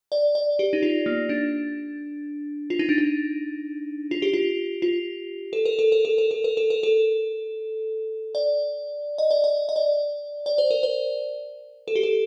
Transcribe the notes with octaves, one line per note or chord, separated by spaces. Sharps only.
D5
D5
G4
D#4
F4
A#3
D4
F4
D#4
D4
D#4
F4
G4
F4
F4
A4
A#4
A4
A#4
A4
A#4
A4
A#4
A4
A#4
A4
D5
D#5
D5
D#5
D#5
D5
D5
C5
A#4
C5
A4
G4
A4